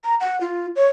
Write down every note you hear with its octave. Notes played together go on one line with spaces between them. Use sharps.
A#5
F#5
F4
C#5